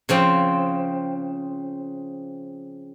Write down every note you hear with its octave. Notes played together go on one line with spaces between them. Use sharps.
C#3 F3 C4